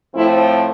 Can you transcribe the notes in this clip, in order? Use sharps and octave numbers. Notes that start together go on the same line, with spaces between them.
A2 F3 A3 C4 E4